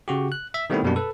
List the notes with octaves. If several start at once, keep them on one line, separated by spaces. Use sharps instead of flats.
C#3 F#4 G4
F#6
E5
D#3 G3 A3 B3 C4 E4
F#2 B2 G3 A#3 D4
A4 B4